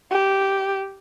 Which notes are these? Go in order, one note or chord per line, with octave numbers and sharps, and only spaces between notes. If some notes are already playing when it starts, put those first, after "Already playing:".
G4